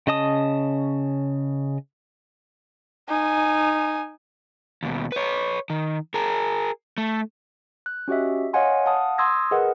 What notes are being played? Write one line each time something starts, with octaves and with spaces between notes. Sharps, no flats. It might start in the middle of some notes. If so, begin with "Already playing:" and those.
C#3 C#4 D#5 A5 D#6
D#4 G#5
D#2 B2
B4 C#5
D#3
G#4 A#4
A3
F#6
C#4 F#4 G4 D#5 E5
C#5 D#5 F5 F#5 G#5 C6
F5 F#5 A5 D#6
C6 D#6 E6 G#6 A#6
G#4 A#4 B4 D#5 F#5